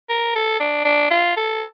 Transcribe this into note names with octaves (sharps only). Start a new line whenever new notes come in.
A#4
A4
D4
D4
F4
A4